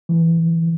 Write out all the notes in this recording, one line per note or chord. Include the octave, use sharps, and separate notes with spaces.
E3